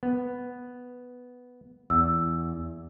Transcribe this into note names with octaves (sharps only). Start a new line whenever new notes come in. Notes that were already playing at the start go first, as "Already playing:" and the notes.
B3
E2 E6